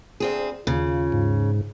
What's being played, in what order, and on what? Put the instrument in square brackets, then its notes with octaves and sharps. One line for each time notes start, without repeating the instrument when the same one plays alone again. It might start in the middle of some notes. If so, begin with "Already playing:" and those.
[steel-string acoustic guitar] D2 C4 G#4
[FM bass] D#2 [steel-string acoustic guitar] C#3 [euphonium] F4
[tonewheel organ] G#2